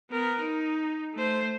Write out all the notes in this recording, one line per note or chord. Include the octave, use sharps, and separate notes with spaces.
B3 A#4
D#4
A3 C5